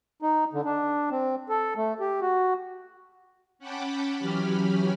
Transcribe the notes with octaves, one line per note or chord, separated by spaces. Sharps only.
D#4
D3
D4
C4
A4
A3
G4
F#4
C#4 F#5 G5 A5 B5 D6
E3 F#3 C#4 G4 B5 F6